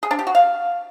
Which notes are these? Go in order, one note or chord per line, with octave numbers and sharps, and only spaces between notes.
G#4
D4
G4
F#4
F5